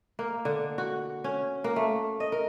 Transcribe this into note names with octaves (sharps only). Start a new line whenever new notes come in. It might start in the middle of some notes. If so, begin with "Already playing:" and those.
A#3
D3
F#4
C#4
A#3
A3
D#5
A#4